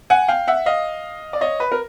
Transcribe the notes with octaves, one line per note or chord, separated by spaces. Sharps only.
F#5 G#5
F5 G5
E5 F#5
D#5 F5
D5
C#5 D#5
B4
A#4